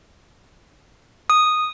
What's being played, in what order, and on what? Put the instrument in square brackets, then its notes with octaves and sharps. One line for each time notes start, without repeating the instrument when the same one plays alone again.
[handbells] D#6